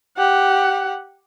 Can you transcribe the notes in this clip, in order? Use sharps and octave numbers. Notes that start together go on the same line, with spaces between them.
G4 F#5